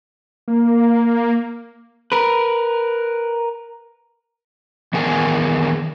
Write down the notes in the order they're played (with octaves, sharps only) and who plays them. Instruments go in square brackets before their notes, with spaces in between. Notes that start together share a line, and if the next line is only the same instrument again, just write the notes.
[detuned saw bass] A#3
[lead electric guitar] A#4 B4
[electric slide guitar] D#3 E3 B3 G#4 A#4 G#5